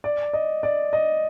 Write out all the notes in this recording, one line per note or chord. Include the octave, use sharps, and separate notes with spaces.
D5
D#5
D5
D#5